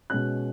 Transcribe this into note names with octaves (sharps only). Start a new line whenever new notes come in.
B2 G#3 C#4 F#6